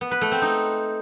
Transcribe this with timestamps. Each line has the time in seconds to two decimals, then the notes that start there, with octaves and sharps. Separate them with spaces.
0.01 B3
0.11 B4
0.21 A3
0.32 C4
0.42 D#4